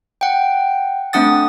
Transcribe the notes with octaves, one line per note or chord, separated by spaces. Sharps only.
F#5 G5
A3 C4 D4 F#5 D#6 A6